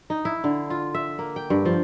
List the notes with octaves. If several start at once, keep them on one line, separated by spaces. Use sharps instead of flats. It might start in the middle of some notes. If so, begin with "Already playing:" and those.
D#4
E4
D3
F4
E5
A#3
G5
G2
F3